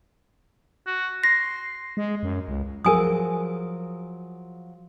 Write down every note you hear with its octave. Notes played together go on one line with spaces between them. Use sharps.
F#4
C6 A#6
G#3
F#2
C#2
F3 F#3 G#4 A#4 G#5 D#6